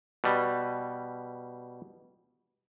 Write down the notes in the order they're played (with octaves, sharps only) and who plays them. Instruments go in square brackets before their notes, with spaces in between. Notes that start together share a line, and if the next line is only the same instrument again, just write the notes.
[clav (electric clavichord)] B2 G3